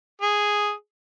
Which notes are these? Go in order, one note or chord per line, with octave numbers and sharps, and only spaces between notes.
G#4